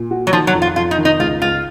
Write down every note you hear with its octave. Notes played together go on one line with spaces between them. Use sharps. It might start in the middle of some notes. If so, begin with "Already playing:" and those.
Already playing: A#2
F#4
F#3
D#3 F3
F#3
F2
F4
F2 F4
D#4
D#3
D#4
C#2 F4
C#2 F4